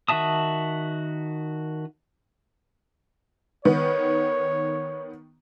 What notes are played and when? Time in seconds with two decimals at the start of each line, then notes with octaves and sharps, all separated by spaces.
0.08 D#3 F#4 E5 A5 D#6
3.65 D#3 B3 C#5